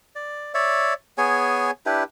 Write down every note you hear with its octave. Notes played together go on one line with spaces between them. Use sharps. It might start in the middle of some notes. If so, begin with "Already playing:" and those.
D5
C#5 D5 E5
B3 G#4 C#5 G#5
D4 E4 G4 B4